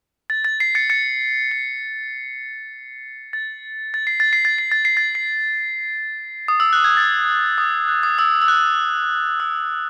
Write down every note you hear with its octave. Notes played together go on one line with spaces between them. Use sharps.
A6
A6
C7
A6 C#7
A6 C#7
C7
A6
A6
C7
A6
C7
A6
C7
A6
C7
A6
C7
D#6
E6
F#6
G#6
A6
D#6
F#6
D#6
E6
E6
F#6
E6